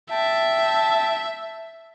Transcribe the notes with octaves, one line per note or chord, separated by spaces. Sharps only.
E5 G5 A5